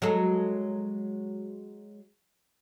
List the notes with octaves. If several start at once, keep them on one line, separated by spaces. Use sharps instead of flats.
F#3 G#3 A4